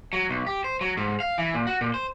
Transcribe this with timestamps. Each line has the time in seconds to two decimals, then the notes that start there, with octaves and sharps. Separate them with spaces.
0.13 F#3
0.29 B1
0.47 G4
0.64 C5
0.81 F#3
0.97 G#2
1.20 F5
1.38 E3
1.54 A#2
1.67 F#4
1.81 A#2
1.94 C5